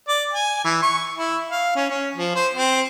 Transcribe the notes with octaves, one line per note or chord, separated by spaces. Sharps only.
D5
G#5
E3
C#6
E4
F5
C#4
C#4
F3
C5
C4